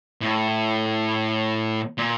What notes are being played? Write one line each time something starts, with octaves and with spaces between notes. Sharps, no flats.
A2
A#2